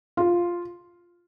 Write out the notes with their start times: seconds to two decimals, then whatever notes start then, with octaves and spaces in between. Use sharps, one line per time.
0.17 F4